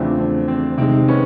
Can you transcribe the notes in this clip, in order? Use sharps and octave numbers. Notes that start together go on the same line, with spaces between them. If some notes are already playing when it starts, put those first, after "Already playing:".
Already playing: E2 C#3 F3 A3 C4 D4
C4
C4
C3 D#3 G#3 C4
B3 C#4